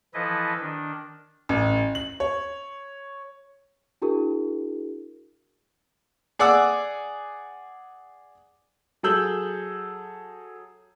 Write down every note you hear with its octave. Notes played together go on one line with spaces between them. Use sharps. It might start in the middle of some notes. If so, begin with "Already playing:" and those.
E3 F3 E4 A4 B4 D#5
D#3 D4
A1
F#7
C#5
D4 E4 F#4 G#4 A#4
G#4 D5 F#5 D6 E6
F#3 G#4 A4 E6 G6 F#7